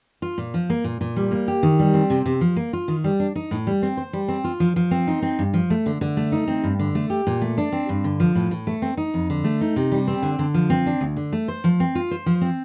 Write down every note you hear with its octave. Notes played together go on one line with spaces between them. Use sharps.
F4
A#2
F3
A#3
A#2
A#2
G3
A#3
G4
D#3
G3
C4
C3
C3
F3
A#3
F4
D#3
G3
D4
D#4
A2
G3
C4
C5
G3
C4
F4
F3
F3
C4
D#4
C4
G2
F3
A3
D3
D3
A3
D#4
C4
G2
D3
A3
G4
A#2
A3
D4
C4
G2
D3
F3
A2
A2
A3
C4
D#4
F2
D3
A3
D#4
C3
G3
C4
D3
D3
F3
C4
D4
D2
D3
A3
C5
F3
C4
F4
C5
F3
C4